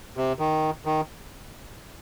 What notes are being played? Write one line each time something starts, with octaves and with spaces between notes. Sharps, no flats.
C3
D#3
D#3